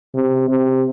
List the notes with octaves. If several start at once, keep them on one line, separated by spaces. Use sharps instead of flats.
C3
C3